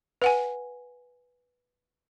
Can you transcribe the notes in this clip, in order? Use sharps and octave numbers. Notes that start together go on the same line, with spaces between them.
B4 F#5 G#5